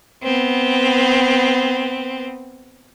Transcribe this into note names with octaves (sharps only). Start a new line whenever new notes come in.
B3 C4